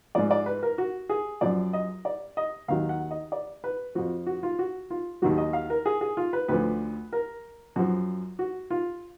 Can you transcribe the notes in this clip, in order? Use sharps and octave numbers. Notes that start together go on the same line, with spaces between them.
G#2 F3 D5
D5
B4
A#4
F#4
G#4
F#2 F3 D5
D#5
D5
D#5
D#2 D#3 F#3 F5
F#5
D#5
D5
B4
F2 F3 F#4
F#4
F4
F#4
F4
D#2 D#3 F#3 F#4
D#5
F5
A#4
G#4
G#4
F4
B4
D2 D3 F3 B4
A#4
F#2 F3 F#4
F#4
F4